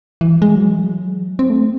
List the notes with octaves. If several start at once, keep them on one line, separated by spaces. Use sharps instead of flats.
E3
G#3
F#3
E3
F#3
C4
A3